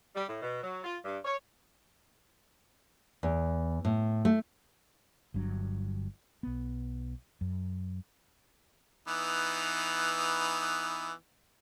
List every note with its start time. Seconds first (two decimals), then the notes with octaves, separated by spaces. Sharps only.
0.16 G3
0.28 A2
0.42 B2
0.63 F#3
0.84 F4
1.04 G2
1.25 C#5
3.23 E2
3.85 A2
4.25 A3
5.34 G1 G2 F#3 D4
6.43 B1 B3
7.41 F#2
9.08 E3 B3 D#4